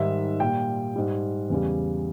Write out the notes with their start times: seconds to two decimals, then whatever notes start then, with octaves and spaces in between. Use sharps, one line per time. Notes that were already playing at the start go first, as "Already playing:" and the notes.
Already playing: G#2 D#3 G3 E5
0.40 A#2 G3 G5
0.96 G#2 G3
1.50 E2 C#3 G3